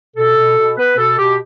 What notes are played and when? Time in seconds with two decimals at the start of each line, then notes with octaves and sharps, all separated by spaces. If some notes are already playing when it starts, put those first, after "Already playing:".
0.16 B2 A4
0.36 B2
0.57 B2
0.77 B3 B4
0.97 B2 A4
1.17 B2 G4